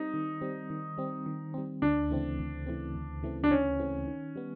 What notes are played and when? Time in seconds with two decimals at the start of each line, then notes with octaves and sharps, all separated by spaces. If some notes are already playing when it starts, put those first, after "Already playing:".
Already playing: G3 C4 D#4
0.14 D#3
0.41 G3 C4
0.70 D#3
0.98 G3 C4
1.26 D#3
1.54 G3 C4
1.82 D2 D4
2.10 C#3 E3 A3 C4
2.39 D2
2.67 C#3 E3 A3 C4
2.95 D2
3.23 C#3 E3 A3 C4
3.44 D4
3.51 D2 C#4
3.79 C#3 E3 A3 C4
4.07 D#3
4.36 G3 B3